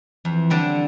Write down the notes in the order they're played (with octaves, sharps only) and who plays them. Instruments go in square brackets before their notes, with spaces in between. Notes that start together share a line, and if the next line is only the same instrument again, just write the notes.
[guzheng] F2 [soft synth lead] E3
[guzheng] D3 G3 D4 A4